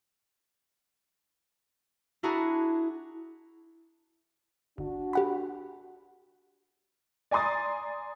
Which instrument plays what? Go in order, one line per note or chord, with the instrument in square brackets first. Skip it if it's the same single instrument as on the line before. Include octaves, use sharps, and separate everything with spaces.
[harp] D4 E4 F#4 G#4 A#5
[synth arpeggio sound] G1 [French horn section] D4 F#4
[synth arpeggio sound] G4 F#5 B5
[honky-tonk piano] D5 G#5 A#5 C6 D#6 A6